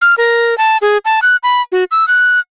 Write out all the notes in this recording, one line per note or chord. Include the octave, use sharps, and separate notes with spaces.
F6
A#4
A5
G#4
A5
F#6
B5
F#4
E6
F#6